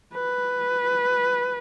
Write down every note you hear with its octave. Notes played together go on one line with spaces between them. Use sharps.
B4